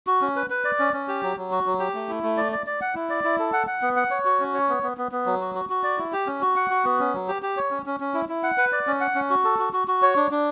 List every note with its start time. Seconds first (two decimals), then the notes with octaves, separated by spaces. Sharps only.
0.07 F#4
0.21 C#4
0.36 B4
0.50 B4
0.64 D5
0.79 C#4
0.94 C#4
1.08 G4
1.23 F#3
1.37 F#3
1.51 F#4
1.66 F#3
1.80 G4
1.95 A3
2.09 E4
2.23 A3
2.37 D5
2.52 D5
2.67 D5
2.81 F#5
2.95 E4
3.10 D5
3.24 E4
3.39 A4
3.53 F#5
3.67 F#5
3.82 B3
3.96 F#5
4.11 C#5
4.25 F#4
4.40 C#4
4.54 C#5
4.69 B3
4.83 B3
4.97 B3
5.12 B3
5.26 F#3
5.40 F#4
5.55 F#4
5.69 F#4
5.83 D5
5.98 E4
6.13 G4
6.27 C#4
6.41 F#4
6.56 F#5
6.70 F#4
6.85 B3
6.99 C#4
7.14 F#3
7.28 G4
7.42 G4
7.57 C#5
7.71 C#4
7.86 C#4
8.00 C#4
8.14 E4
8.29 E4
8.43 F#5
8.58 B4
8.72 D5
8.87 C#4
9.01 F#5
9.15 C#4
9.30 F#4
9.44 A4
9.59 F#4
9.73 F#4
9.88 F#4
10.02 C#5
10.16 D4
10.31 D4